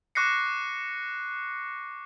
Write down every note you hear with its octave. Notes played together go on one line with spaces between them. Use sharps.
C#6 D6 F#6 A#6 C7 C#7